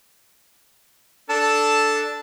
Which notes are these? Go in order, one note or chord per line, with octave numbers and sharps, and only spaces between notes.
D4 A4 A5